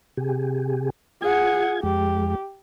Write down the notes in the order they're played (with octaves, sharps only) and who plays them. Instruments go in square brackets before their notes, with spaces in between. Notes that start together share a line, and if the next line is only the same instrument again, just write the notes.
[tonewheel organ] C3 G4 G#4
[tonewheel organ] F4 G#6 [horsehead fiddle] G#4 F#5
[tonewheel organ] F2 G#3 [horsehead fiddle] G4